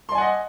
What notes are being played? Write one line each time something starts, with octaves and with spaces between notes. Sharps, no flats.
D5 D#5 F#5 G#5 C6